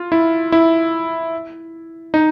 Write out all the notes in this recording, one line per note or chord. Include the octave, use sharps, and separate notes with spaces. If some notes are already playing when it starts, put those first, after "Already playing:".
Already playing: F4
E4
E4
D#4